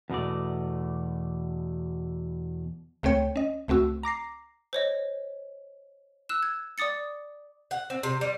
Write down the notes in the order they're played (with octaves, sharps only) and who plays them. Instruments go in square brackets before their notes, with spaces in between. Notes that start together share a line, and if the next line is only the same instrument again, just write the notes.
[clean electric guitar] E2 B2 A3 D5
[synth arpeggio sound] C#2 A3 C4 C#5 G5 C#7
C#4 D#5
C#2 A3 C4 F#4 E6
A#5 D6 A#6 C7
[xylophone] C5 C#5 D#5
E6 F#6 E7
G#6
D5 D6 D#6 A6 C#7
[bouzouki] F#5
C4
C3
G3